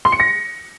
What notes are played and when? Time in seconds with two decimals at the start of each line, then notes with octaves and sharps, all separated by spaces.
0.05 C6
0.12 C#7
0.20 A#6